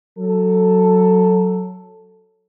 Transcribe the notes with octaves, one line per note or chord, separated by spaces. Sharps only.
F#3 A4